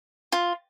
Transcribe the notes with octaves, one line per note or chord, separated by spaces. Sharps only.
F4